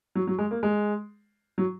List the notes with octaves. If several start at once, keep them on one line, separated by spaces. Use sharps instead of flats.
F#3
F#3
G#3
A#3
G#3
F#3